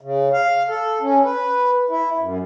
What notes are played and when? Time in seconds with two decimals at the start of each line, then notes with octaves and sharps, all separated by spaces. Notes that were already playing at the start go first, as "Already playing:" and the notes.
0.01 C#3
0.33 F5
0.68 A4
1.01 C#4
1.24 B4
1.90 E4
2.18 F#2